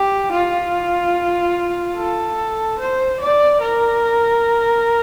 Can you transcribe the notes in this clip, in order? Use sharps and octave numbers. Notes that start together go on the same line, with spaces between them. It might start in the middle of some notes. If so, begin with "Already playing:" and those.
Already playing: G4
F4
A4
C5
D5
A#4